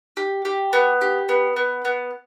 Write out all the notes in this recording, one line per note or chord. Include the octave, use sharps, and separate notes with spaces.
G4
G4
B3
G4
B3
B3
B3